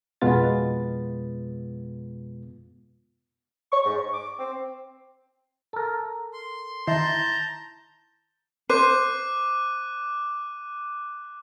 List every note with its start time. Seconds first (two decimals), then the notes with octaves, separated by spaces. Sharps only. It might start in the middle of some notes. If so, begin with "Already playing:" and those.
0.21 F2 B2 G#3 B3 F4 A6
3.71 C#6
3.85 G#2
3.96 C#6
4.13 D6
4.39 C4
5.73 A4 A#4
6.33 C6
6.87 D#3 E4 A5 A#5 C6 G6
8.70 C5 D6 F#6 D#7